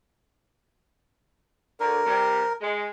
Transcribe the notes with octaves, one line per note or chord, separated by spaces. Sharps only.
D2 D3 A#4
C3 G3
G#3